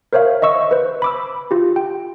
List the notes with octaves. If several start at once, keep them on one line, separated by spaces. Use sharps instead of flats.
A#4 C5 C#5 E5 F5
D#5 E5 C#6 E6
B4 C5
B5 D6 E6
F4 G4
G5